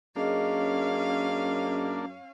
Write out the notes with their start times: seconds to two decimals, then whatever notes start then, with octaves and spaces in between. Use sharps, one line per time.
0.16 F#2 A#3 C#4 D4 G#4 D#5 F5